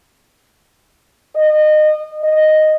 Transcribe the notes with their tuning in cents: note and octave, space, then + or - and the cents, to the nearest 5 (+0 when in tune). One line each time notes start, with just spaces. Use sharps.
D#5 -25
D#5 -5